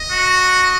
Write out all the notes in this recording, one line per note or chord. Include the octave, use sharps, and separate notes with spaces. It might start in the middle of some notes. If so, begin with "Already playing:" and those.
Already playing: D#5
F#4